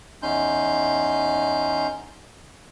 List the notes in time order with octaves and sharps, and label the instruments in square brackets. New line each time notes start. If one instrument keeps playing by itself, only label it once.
[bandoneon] E2 C#4 D#4 C6 G6